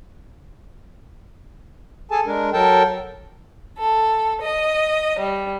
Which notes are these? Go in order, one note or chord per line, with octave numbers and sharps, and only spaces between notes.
G#4 A4 G#5 A5
G#3 D4 A#4
F#3 A4 A#4 G5 A5
A4
D#5
G3